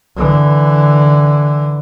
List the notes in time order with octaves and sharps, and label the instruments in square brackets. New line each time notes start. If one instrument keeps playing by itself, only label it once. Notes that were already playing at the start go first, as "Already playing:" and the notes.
[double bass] D3 E3